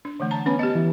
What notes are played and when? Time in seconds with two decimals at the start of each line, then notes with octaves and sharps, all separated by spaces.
0.05 D4
0.20 D3 E3 A3
0.31 A5 A#5
0.46 B3 C#4 B4 B5
0.59 G4 D#5 A5
0.75 E3